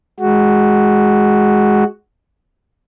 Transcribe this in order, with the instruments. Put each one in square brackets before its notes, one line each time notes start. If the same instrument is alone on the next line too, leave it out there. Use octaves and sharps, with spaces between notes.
[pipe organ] G#3 F#4